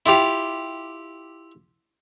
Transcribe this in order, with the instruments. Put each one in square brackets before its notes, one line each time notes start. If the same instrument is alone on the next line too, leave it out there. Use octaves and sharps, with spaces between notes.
[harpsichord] E4 F4 G4 F5